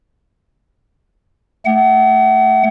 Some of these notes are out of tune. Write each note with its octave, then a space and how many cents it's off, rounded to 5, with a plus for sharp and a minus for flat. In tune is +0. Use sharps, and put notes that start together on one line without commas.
A3 +0 F#5 +35